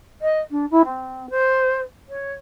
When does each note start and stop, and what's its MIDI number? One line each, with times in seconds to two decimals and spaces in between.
0.22 0.40 75
0.51 0.65 62
0.71 0.82 64
0.85 1.30 60
1.30 1.78 72
2.09 2.33 73